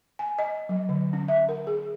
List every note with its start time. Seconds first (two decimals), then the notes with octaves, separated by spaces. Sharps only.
0.19 G#5
0.39 D#5
0.69 F#3
0.89 D3
1.13 C#4
1.28 E5
1.49 A#4
1.67 G#4